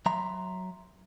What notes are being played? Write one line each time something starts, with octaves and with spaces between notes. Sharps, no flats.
F#3 E5 A#5 C6